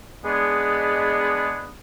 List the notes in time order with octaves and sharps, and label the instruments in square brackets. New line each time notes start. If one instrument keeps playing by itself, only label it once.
[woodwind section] G#3 B3 D4 G#4